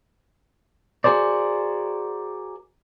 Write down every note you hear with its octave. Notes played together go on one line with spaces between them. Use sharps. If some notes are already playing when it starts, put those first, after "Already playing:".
F#4 G#4 A#4 C5 D5